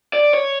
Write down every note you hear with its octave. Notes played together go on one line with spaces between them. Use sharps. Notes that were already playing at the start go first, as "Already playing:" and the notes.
D5
C#5